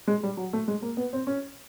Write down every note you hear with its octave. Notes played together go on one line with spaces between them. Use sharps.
G#3
G3
F#3
A3
G#3
A#3
B3
C4
C#4